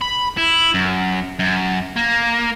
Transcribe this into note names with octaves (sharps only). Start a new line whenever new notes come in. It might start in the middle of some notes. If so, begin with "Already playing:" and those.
B5
E4
F#2
F#2
A#3